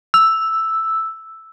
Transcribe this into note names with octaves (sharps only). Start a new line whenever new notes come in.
E6